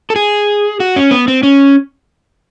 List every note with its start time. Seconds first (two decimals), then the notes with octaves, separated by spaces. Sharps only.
0.10 A4
0.16 G#4
0.80 F#4
0.96 C#4
1.11 B3
1.28 C4
1.43 C#4